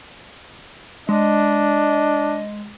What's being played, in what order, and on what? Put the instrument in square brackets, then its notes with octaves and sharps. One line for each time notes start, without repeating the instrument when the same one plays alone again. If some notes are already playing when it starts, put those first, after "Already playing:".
[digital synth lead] G#3 [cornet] D4 [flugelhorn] D#5